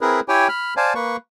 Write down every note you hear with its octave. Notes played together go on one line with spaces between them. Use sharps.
C4 E4 G#4 A#4 B4
E4 G4 C#5 G5 G#5
B5 F6
C5 D5 F5 G#5 A5
A#3 B4 C#6